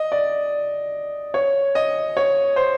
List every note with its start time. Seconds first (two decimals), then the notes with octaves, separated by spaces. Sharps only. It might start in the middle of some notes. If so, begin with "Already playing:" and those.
Already playing: D#5
0.12 D5
1.34 C#5
1.75 D#5
2.17 C#5
2.56 C5